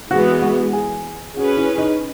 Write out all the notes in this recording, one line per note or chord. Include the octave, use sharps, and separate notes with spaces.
E3 G#3 B3 F#4
F#4
G#4
C#4 F#4 G#4 B4
E4
D#4